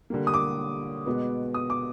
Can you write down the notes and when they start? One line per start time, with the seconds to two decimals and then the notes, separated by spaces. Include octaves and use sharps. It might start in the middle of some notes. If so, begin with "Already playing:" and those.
0.10 D3 G3 A#3
0.27 D#6
0.34 D6
1.06 B2 G#3 B3
1.54 D#6
1.70 D6